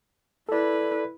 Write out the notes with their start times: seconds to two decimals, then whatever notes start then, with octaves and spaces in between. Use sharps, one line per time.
0.49 E4 A4 B4 D5